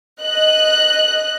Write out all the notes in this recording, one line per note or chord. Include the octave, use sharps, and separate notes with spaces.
D#5 F#6